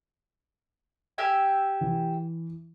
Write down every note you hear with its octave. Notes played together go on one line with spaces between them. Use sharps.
G4 E5 G#5
E3